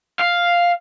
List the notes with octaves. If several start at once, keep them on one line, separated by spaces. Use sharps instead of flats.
F5